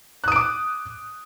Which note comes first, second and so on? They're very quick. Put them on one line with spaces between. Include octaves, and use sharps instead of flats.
F#6 D#6 D7 D6